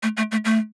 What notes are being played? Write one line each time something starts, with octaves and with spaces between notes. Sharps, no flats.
A3
A3
A3
A3